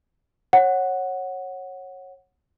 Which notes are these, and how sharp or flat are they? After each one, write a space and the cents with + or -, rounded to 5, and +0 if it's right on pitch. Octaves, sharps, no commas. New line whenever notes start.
C#5 -20 F#5 +0